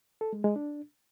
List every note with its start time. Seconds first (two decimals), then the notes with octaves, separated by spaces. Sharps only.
0.21 A4
0.33 G#3
0.44 G#3
0.56 D4